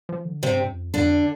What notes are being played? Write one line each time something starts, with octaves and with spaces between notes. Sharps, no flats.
F3
D3
G2 C3 C4
F2
F2 D3 D4